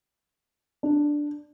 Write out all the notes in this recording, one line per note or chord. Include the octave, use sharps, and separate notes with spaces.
D4